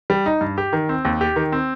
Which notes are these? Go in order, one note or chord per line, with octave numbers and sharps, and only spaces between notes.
G3
D#4
G2
G4
D#3
C4
D#2
G4
D#3
C4